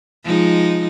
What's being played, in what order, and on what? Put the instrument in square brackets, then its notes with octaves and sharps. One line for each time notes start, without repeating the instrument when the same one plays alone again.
[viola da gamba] F3 G#3 D#4